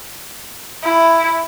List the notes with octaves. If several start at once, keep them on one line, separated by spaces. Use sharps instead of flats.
E4